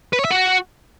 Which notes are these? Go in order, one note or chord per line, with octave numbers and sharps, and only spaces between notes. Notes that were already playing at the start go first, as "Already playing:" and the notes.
B4
C#5
E5
F#4